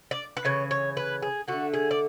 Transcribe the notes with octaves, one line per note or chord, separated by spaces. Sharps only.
D5
B4
C#3 E3 C#5
C#5
B4
G#4
D3 A3 F#4
G#4
D5